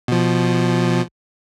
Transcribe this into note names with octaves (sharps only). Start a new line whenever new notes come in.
B2 F3